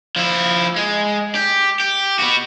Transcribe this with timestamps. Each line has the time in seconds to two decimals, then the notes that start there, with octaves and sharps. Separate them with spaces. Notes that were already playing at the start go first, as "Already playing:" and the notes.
0.16 F3 E4
0.76 G#3
1.35 G4
1.80 G4
2.19 B3 F#4